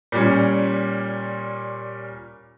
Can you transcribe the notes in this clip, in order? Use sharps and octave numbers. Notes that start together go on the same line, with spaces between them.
A#2 G3 C#4